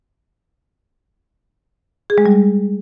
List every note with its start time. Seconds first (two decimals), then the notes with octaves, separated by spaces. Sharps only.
2.10 G#4
2.18 G#3
2.26 G3